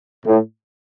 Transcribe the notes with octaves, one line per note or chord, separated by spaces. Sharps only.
A2